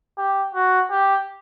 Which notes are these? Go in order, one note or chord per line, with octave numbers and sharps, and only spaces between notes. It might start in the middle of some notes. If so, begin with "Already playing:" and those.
G4
F#4
G4